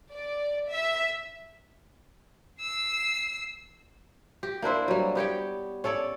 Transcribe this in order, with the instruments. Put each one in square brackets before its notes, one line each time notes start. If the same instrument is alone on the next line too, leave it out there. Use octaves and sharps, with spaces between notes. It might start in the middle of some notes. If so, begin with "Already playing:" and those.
[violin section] D5
E5
[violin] E6 C7
[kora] G4
A#3 D4 E4 C5
F#3 G3
B3 G4 C#5 G5
C#4 A4 C#5 D5